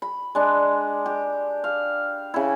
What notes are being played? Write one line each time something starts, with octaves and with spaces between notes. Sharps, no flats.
B5
G#3 D4
G4
F5
C#3 E4